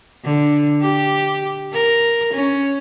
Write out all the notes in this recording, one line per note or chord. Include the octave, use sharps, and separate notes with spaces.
D3
G4
A#4
C#4